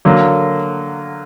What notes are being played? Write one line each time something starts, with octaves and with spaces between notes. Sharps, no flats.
D3 F#3 A#3